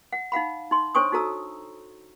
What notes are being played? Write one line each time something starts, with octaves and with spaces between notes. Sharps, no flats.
F#5
D#4 F5 F#5 B5
D#4 C6
D4 C5 C#5 G#5 C#6 D#6
D#4 F#4 A4 A#5 E6